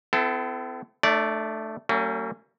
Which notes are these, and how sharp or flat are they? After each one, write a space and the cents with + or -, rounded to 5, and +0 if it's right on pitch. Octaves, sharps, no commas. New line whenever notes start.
C4 -45 E4 +30 A4 +0
A3 +0 D4 +45 D5 -15
F#3 +40 A#3 -45 C#4 +0